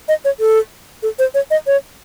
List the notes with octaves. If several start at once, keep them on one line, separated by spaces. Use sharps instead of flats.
D#5
C#5
A4
A4
C5
C#5
D#5
C#5